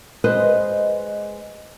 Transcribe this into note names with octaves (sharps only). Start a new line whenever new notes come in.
G#3 B4 C5 D#5